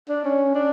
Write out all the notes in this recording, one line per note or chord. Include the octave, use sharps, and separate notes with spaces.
D4
C#4
D4